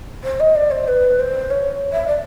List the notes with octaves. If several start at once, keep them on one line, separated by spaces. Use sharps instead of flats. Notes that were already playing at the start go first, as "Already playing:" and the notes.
C5
D#5
D5
C5
B4
C5
C#5
E5
D5